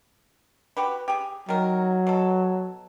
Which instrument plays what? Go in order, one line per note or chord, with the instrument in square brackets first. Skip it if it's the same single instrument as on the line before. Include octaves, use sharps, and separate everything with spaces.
[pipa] F#4 G4 B4
G4 G#4
[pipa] D#3 A#4 [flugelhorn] F#3
[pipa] B2 A4